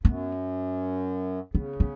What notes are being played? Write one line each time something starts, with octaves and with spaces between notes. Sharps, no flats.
F#2 B3
C#3 B3
B3